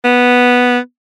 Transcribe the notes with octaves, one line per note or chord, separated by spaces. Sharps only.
B3